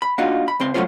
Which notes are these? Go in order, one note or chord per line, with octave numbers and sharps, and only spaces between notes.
B5
A#3 D4 D#4 F4 F#4
B5
C#2 C4 C6
F#3 G#3 A3 C#4 F4 C5